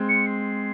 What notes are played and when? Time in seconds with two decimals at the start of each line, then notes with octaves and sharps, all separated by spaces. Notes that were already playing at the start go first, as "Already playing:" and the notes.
Already playing: G#3 C4
0.08 C#7
0.26 C7